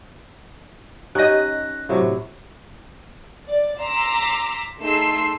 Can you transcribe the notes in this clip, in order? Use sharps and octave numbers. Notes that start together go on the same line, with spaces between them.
C#4 D#4 G4 D#5 F#5 F#6 A#6
A2 C3 F#3
D5
A#5 C6 D6 E6 A#6 B6
A3 D#4 G#4 C6 E6 C7